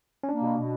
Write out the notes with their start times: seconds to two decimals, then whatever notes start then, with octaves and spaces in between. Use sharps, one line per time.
0.23 C#4
0.29 A#3 D4
0.42 B2
0.57 B2